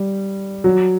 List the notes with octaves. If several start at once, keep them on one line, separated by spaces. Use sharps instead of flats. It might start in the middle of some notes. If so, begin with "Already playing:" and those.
Already playing: G3
F#3